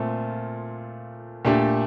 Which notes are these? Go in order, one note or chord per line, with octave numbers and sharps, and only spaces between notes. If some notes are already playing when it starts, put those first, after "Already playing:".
Already playing: A#2 A3 C4 F4
A#2 A3 D4 G4